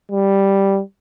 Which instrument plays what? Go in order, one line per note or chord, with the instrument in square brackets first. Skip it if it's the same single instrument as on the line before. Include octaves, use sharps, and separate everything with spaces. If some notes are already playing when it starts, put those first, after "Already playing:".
[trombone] G3